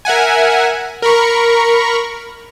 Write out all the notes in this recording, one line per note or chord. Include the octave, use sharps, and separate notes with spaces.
A#4 E5 F#5 G#5
A#4 B5 C#6